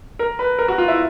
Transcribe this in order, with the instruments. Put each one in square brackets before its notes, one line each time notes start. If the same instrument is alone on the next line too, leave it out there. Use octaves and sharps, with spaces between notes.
[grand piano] A#4
B4
A#4
F#4
F4
E4